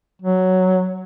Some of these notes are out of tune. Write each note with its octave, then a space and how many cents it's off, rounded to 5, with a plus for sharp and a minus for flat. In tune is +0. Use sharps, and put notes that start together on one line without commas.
F#3 +5